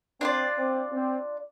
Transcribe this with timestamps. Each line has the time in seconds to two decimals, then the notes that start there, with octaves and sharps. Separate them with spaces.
0.21 C4 D4 F4 D5
0.57 C4
0.92 C4